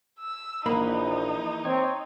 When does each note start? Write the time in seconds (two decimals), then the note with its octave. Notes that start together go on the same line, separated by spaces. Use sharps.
0.19 E6
0.66 A#1 E3 A#3 D#4 B5
1.65 C4 C#5